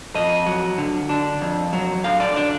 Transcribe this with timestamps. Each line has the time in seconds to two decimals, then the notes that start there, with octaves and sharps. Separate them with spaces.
0.15 F2 D#5
0.46 F#3
0.78 D3
1.09 D4
1.41 F2
1.73 F#3
2.04 D3 F5
2.20 D5
2.36 D4 D5